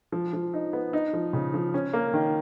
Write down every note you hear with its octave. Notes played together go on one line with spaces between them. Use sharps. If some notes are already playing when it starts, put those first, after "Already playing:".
F3
F3
D#4
B3
D#4
F3
C#3
F3
C#4
A#3
D#3